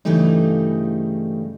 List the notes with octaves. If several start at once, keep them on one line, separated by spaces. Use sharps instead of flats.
G2 C#3 E3 G3 A3 D#4